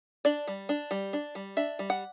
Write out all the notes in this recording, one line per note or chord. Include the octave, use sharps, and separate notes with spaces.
D4 D5
G3
D4
G3
D4
G3
D4 E5
G3
F#5